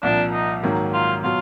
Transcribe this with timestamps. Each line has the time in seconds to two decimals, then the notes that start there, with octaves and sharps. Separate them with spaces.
0.03 C2 A#2 F3 D4
0.33 D#4
0.63 G#2 D#3 F#3 A#3
0.93 F4
1.24 B2 F#3 F4